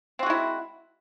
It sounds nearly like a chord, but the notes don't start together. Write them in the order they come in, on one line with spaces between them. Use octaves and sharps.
C4 F#4 G#3 E4